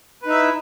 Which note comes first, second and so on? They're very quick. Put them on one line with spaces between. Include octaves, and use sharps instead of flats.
B4 D#4 E5 E4